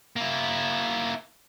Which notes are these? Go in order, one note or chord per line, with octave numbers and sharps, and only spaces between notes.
A#3 E4